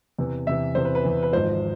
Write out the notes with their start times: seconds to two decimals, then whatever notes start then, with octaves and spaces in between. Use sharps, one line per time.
0.19 E2 C3 E3
0.47 E2 C3 E3 E5
0.75 E2 C3 E3 C5
0.85 B4
0.95 B4
1.05 E2 C3 E3
1.23 B4
1.33 G#1 G#2 F3 C5